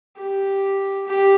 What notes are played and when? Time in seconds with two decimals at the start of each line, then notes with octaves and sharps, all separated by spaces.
0.17 G4
1.07 G4